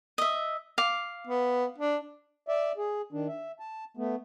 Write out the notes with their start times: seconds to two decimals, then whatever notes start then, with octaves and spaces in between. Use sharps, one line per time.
0.18 D#5 E5
0.78 F5 D6
1.27 B3
1.78 D4
2.48 D5 E5
2.77 G#4
3.12 D#3 D4
3.28 E5
3.60 A5
3.97 A3 B3